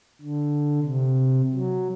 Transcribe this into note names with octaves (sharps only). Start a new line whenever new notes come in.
D3
C3
F#3